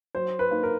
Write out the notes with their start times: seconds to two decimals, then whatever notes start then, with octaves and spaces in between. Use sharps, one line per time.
0.15 F#3 C5
0.39 B4
0.51 A#3 D#4
0.63 A#4